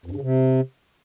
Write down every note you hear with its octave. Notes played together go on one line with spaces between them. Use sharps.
F2
G2
C#3
C3